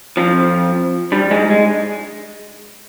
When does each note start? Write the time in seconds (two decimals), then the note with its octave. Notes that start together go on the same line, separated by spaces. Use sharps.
0.17 F2 F3
1.12 G2 G3
1.31 G#2 G#3
1.50 G#3